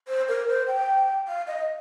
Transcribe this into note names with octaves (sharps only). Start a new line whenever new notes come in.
C5
A#4
C5
G5
F5
D#5